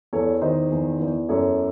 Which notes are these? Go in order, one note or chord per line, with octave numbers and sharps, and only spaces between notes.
E2 A4 C#5
D#3 C5 D#5
E2
E2
F#2 A4 C#5